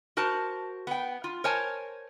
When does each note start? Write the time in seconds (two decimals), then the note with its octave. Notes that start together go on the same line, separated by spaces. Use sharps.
0.17 F#4 A#4 C5 A5
0.87 B3 G5
1.24 F4
1.44 A#4 C5 C#5 G#5 A5